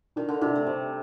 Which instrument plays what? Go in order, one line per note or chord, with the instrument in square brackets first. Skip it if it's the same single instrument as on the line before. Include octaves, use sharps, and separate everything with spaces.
[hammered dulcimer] D#3 [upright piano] D4
[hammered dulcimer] D3
[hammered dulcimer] C3 [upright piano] D4
[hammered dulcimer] A3
[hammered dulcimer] G3 [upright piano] C4